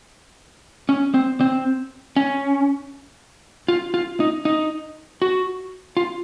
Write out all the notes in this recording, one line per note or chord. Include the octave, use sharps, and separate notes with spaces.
C#4
C4
C4
C#4
F4
F4
D#4
D#4
F#4
F4